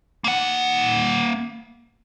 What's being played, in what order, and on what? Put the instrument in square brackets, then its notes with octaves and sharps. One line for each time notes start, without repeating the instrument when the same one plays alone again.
[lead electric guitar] A#3 F#5